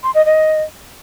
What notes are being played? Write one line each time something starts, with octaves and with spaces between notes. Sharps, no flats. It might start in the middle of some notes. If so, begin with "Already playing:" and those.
C6
D#5
D#5